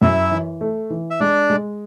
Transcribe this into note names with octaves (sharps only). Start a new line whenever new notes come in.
F#2 E4 E5
E3
A3
E3
E5
G#3 D4 D5
G#3